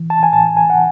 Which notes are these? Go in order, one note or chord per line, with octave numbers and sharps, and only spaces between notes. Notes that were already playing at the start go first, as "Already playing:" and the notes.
Already playing: E3
A5
G#5
A2 A5
G#5
F#5